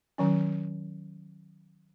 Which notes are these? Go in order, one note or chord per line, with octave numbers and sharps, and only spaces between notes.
D#3 F#3 C#4